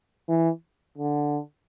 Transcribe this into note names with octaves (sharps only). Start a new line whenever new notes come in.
E3
D3